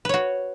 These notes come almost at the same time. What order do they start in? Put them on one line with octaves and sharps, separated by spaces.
B4 C#5 F#4